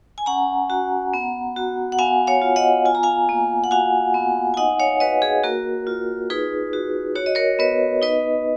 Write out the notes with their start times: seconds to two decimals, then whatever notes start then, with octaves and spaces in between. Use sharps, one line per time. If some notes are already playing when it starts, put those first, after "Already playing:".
0.18 G#5
0.26 C#4 F#5 A#5
0.70 F#4
1.13 B3
1.56 F#4
1.92 F#5
1.98 B3 F5 G#5
2.27 C#5 F5
2.42 F4
2.56 D#5 F#5
2.85 F4 G#5
2.95 A#5
3.03 F5 G#5
3.29 A#3
3.64 F#5
3.71 F#4 F5 G#5
4.14 B3
4.54 G#5
4.57 D#4 D#5 F#5
4.80 C#5 F5
5.00 F#4 B4 D#5
5.22 G#4
5.44 A#3 F#4 A#4
5.87 F4
6.30 D#4 G#4 B4
6.73 F#4
7.16 F#4 C#5
7.26 D#5
7.35 A#4 C#5
7.59 B3 B4 D#5
8.02 D#4 B4 D#5